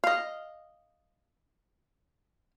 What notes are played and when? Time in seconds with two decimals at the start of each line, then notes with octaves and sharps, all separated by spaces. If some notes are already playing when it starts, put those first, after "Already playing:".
0.04 D#5 F5